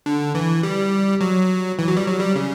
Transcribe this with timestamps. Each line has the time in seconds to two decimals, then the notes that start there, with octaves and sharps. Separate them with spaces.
0.06 D3
0.35 E3
0.63 G3
1.21 F#3
1.79 E3
1.87 F#3
1.97 G3
2.07 F#3
2.21 G3
2.36 C#3